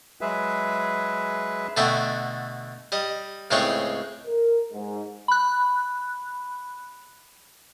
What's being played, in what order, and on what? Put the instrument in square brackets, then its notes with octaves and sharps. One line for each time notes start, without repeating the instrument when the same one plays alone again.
[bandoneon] F#3 G#3 G#4 B4 E5
[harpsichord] B2 D3 A3 F#4 E5 G5
G3 D#5
C#2 A2 G#3 C4 C#5 G5
[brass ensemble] A#4
G#2
[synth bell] B5 F#6